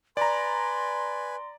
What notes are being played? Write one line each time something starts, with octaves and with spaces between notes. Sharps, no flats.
B4 D5 G#5 A#5 C6